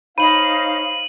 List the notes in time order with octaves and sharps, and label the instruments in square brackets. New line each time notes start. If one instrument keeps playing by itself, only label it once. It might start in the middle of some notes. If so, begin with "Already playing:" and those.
[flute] D#4 [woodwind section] C5 C#5 F5 [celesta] B5 [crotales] D#7 F#7